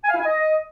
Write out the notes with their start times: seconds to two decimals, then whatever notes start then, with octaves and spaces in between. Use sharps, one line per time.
0.04 G#5
0.10 F5
0.15 E4
0.20 G#5
0.26 D#5